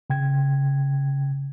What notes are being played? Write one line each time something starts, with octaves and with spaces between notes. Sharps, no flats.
C#3 G5 G#6